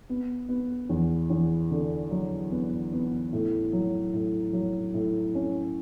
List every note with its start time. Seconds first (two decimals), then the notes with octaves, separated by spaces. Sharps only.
0.10 B3
0.49 B3
0.89 E2
1.30 E2
1.71 D3
2.11 F#3
2.51 B3
2.93 B3
3.33 A2
3.73 F#3
4.14 A2
4.53 F#3
4.94 A2
5.35 C#4